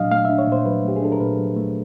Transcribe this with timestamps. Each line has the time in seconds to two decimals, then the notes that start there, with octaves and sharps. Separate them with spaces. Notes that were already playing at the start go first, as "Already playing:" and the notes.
Already playing: A#2 F#3 D4 D#5 F5
0.11 A3 F5
0.25 E5
0.29 D4
0.39 C#5
0.48 A#2 C5
0.66 F#3 B4
0.84 A3 G4
0.96 G#4
1.02 D4 A4
1.12 A#4
1.20 A#2 B4
1.38 F#3
1.56 A3